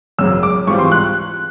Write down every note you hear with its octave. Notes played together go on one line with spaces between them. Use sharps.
G#1 F#2 C#3 F#3 E6
D6
G#2 E3 G3 C4 F4 C#6
C6
F#6